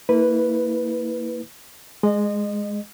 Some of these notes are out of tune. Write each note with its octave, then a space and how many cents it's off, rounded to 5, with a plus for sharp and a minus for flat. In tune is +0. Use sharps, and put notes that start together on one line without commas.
A#3 -25 E4 -25 B4 +0
G#3 +0 D#5 -25